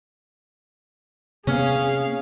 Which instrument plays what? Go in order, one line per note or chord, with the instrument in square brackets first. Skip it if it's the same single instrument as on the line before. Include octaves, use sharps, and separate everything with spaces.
[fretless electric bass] C3 A#3 B3 [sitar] C#4 [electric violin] G#4 F5